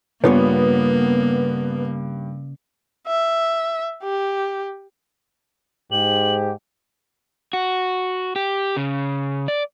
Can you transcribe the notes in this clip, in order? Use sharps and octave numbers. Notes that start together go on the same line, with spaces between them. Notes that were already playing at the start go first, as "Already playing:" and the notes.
G2 C#3 A#3 B3 F4 C#5
E5
G4
G#2 G4 F#7
F#4
G4
C#3
D5